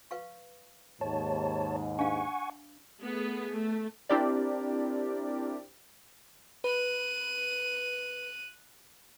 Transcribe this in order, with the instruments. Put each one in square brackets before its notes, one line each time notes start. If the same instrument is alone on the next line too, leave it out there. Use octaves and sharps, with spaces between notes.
[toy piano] B4 F5 C#6
[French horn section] D#2 G#2 [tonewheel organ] C#5 A5
[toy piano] D4 F5 [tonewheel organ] F#5 G#5 C#6
[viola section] A3 B3 G#4
A3
[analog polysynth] C4 D4 E4 G4 A#4 D5
[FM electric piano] B4 [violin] F#6 D#7